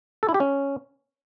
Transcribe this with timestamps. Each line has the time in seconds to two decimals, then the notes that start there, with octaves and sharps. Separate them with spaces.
0.23 A4
0.29 E4
0.34 G4
0.40 C#4